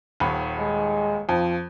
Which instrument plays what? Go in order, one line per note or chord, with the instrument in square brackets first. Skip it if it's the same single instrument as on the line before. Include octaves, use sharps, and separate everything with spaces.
[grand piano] D#1 D#2 B5
[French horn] G#3
[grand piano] F2 [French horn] F3